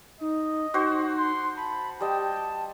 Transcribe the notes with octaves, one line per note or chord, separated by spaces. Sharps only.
D#4 D#5
D#4 F#4 C5
C6
A5 B5
G3 D#5 G5 A5